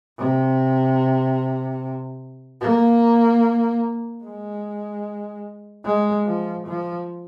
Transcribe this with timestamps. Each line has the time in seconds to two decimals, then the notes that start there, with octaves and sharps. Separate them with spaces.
0.19 C3
2.62 A#3
4.24 G#3
5.85 G#3
6.27 F3
6.67 F3